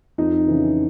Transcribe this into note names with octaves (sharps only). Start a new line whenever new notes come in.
F2 D#4
C#3 E3